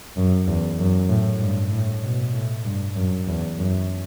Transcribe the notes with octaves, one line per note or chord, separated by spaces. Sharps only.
F#2
E2
F#2
A2
G2
A2
B2
A2
G2
F#2
E2
F#2